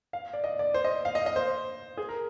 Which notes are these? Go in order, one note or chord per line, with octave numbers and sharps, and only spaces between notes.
F5
D5
D#5
D5
C5
D#5
F5
D#5
D#5
C5
G#4
A#4